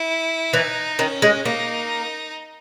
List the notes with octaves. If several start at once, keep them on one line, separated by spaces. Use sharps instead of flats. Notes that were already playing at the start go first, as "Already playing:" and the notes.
Already playing: E4
E3 D#4
D#3 C#4
G#3
A#3 D#4